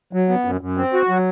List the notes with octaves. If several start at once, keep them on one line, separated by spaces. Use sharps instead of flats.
F#3
B3
F#2
F#2
C4
F#4
F#3